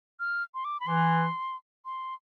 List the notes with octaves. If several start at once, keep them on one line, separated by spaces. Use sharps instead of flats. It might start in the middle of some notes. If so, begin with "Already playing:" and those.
F6
C6
D6
B5
E3 C6
C6